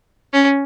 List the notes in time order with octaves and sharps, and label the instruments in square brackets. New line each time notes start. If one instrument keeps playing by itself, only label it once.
[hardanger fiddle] C#4